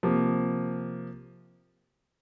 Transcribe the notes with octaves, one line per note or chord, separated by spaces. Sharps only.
C3 F3 A#3